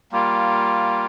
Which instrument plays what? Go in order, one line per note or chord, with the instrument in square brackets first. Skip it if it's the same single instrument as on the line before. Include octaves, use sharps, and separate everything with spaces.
[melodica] G3 A#3 F4